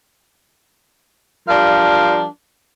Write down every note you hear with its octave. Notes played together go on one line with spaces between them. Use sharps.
F3 G3 D4 A#4 F5